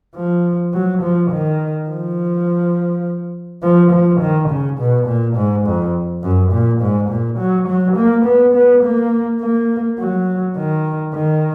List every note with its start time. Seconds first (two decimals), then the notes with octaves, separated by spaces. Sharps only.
0.15 F3
0.74 F#3
1.02 F3
1.31 D#3
1.89 F3
3.63 F3
3.91 F3
4.20 D#3
4.49 C#3
4.79 B2
5.07 A#2
5.36 G#2
5.66 F2
6.23 F#2
6.52 A#2
6.81 G#2
7.09 A#2
7.38 F#3
7.68 F#3
7.97 A#3
8.25 B3
8.54 B3
8.83 A#3
9.41 A#3
9.99 F#3
10.56 D#3
11.14 D#3